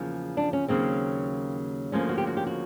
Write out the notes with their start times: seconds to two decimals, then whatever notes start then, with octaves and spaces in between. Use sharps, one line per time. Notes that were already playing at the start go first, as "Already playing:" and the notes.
Already playing: E2 C#3 F3 A#3
0.37 D4
0.53 C#4
0.68 D#2 C#3 F#3 A#3 C4
1.92 D2 C#3 F3 A#3 C#4
2.09 F#4
2.18 G4
2.27 F#4
2.37 G4
2.47 F#4